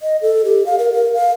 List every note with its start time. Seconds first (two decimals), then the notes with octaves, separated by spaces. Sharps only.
0.02 D#5
0.22 A4
0.45 G4
0.66 F5
0.79 A#4
0.93 A#4
1.14 F5